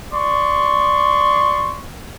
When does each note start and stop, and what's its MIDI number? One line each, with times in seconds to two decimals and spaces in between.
0.13 1.81 74
0.13 1.81 84
0.13 1.81 85